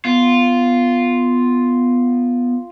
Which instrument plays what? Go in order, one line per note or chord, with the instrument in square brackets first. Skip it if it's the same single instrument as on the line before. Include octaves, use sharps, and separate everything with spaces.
[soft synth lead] B3 [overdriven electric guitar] F4